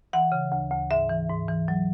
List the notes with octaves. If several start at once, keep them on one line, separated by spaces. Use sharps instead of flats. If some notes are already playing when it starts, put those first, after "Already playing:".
E3 F#5
C#3
D2
D2
G#2 E5
E3
G#2
E3
F#3